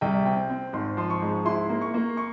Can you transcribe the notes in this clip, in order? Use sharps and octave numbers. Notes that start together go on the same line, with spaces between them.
C2 G5
C4 G5
C4
G#1 C6
F3 C6
C#6
G#2
E4 C6
A#3
C#6
A#3
C#6